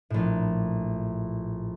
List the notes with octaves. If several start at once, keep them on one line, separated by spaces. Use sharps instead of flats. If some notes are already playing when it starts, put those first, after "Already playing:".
A#1 A2